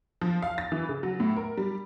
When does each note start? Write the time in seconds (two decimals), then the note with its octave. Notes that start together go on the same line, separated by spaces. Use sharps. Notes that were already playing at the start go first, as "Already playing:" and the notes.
0.21 F3
0.42 F5
0.58 A6
0.72 E3
0.89 C#3
1.03 F#3
1.20 A2
1.37 A#4
1.57 G3